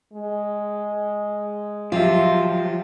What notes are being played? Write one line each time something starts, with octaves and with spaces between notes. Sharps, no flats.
G#3
F3 F#3 F4 G4 E5